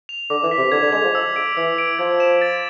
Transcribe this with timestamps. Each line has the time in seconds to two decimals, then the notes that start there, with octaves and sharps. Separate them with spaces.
0.09 F7
0.30 D3 D6
0.43 E3
0.51 B6
0.58 C3
0.72 D3 G#6
0.83 D3
0.93 G#3 F7
1.04 F3
1.15 E6
1.36 D7
1.57 E3 E6
1.78 D7
1.99 F3 G#6
2.20 E7
2.42 A6